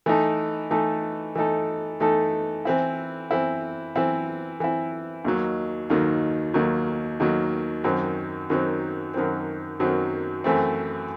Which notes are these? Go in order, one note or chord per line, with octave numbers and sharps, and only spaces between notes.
E3 A3 D#4 A4
E3 A3 D#4 A4
E3 A3 D#4 A4
E3 A3 D#4 A4
E3 C4 E4
E3 C4 E4
E3 C4 E4
E3 C4 E4
D#2 D#3 F#3
D#2 D#3 F#3
D#2 D#3 F#3
D#2 D#3 F#3
F#2 D#3 F#3 C4
F#2 D#3 F#3 C4
F#2 D#3 F#3 C4
F#2 D#3 F#3 C4
F#2 E3 A3 C4